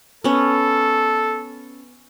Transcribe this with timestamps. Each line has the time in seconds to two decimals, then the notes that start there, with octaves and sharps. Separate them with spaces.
0.24 B3 C#4 A4